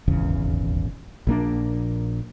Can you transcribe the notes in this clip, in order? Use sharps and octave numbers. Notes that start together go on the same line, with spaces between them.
D#1 G#1 E2 C#3
A#1 A#3 D4